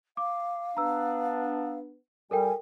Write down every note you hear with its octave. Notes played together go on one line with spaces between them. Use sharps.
F5 D6
B3 D4 A#5 E6
G3 A4 A#4 G5 G#5